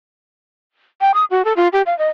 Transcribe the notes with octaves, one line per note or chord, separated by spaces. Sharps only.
G5
D#6
F#4
A4
F4
G4
F5
D#5